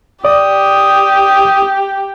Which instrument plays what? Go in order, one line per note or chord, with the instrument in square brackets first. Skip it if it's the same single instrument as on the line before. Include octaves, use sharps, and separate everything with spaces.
[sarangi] G4 [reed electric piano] D5 [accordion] D#6